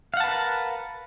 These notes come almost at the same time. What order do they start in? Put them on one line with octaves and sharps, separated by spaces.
F5 F#5 A5 B4 A#4